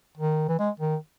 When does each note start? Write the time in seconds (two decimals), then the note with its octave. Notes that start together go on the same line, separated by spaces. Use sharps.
0.18 D#3
0.48 E3
0.59 G#3
0.80 D#3